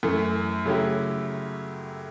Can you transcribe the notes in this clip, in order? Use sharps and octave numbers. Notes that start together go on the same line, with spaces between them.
F#2 E3 A3
C#3 F#3 A3 E4 G4